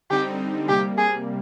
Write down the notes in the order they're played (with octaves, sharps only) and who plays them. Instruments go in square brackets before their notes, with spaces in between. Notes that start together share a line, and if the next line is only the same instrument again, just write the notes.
[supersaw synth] D3 G3 C4 D#4 [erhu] G4
[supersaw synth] C3 G3 A#3 [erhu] G4
[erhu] G#4